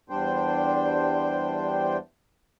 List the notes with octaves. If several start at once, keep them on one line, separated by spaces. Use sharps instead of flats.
E2 G3 D4 C5 G5